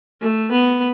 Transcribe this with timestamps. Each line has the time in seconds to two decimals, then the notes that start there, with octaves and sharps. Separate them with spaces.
0.21 A3
0.51 B3